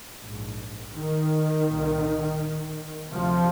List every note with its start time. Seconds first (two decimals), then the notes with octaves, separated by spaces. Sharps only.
0.21 A#1 G#2
0.93 D#3
1.67 C2 A#2
3.12 D2 C3 F3